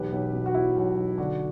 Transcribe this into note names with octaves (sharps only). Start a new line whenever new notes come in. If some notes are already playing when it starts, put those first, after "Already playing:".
Already playing: E1 B1 G4 B4
B1
B2
F#4
F#3 E4
B1
B1
D3 D4 F#4